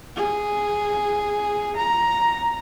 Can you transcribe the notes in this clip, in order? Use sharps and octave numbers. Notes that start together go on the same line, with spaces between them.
G#4
A#5